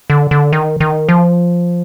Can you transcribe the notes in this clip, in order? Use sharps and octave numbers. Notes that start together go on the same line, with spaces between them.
D3
D3
D#3
D#3
F3